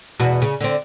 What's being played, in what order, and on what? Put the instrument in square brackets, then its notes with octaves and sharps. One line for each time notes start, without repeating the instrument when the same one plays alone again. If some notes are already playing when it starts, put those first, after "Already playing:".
[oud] E2 B2 F#4
C#3
D3 C4